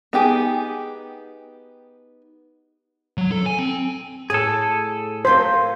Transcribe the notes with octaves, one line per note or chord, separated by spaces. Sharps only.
B3 D#4 G4 G#4
F#3
A4
G#5
C4
A2 G#4 A4 G#5
C4 F4 A#4 C5